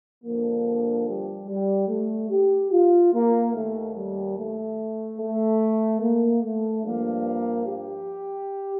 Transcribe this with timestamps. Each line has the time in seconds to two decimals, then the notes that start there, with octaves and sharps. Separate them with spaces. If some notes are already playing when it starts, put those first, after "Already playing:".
0.24 G2 D3 F3 A#3
1.07 G3
1.47 G3
1.88 A3
2.30 G4
2.71 F4
3.13 A#3
3.53 D#2 D#3 A3
3.95 G3
4.36 A3
5.18 A3
6.01 A#3
6.42 A3
6.83 G2 F3 A#3
7.65 G4